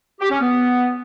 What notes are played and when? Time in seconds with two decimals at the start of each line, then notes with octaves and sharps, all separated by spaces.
0.19 G4
0.30 C#4
0.40 B3